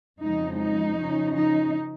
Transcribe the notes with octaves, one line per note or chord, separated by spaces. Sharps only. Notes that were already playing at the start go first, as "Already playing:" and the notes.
F2 C#3 F3 G#3 D#4
D#4
C#3 F3 C#4
D#4